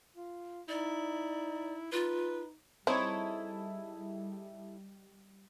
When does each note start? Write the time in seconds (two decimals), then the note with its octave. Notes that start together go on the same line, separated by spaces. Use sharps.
0.16 F4
0.69 D#4 E4 D5
1.92 D#4 F4 B4
2.87 G3 C4 D#4 E4 G#4 A4 C#5